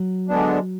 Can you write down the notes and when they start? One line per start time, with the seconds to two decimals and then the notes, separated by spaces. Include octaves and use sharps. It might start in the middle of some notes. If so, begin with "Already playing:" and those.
Already playing: F#3
0.29 D3 G#3 B3 D4